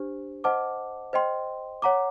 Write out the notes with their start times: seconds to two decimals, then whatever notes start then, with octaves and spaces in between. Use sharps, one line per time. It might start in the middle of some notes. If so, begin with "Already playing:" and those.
Already playing: D4 G4 C5
0.44 C5 D#5 F#5 A5 D6
1.13 C5 D#5 G5 C6
1.82 C#5 F#5 A#5 D6